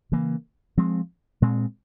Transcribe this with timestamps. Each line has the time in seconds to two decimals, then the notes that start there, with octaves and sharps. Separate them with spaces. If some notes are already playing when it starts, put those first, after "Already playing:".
0.12 C#3 E3 A#3
0.77 F3 G#3 C4
1.42 A#2 G#3 C4